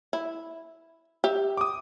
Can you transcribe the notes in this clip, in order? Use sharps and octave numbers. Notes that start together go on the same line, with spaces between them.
E4
G4 E5
D6 D#6